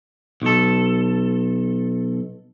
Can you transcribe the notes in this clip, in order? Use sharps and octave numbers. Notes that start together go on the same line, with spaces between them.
B1 A4